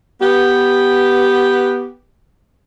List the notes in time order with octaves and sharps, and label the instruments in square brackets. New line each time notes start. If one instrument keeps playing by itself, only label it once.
[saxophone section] B3 G4